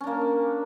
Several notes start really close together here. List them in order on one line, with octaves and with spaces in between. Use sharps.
C#4 D4 A#3